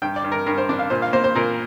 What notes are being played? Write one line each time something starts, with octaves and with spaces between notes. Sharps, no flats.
G2 G5
D5
G2
A#4
G2 A#4
C5
D4
F5
A#2 C5
F5
A#3 C5
C5
A#2 A#4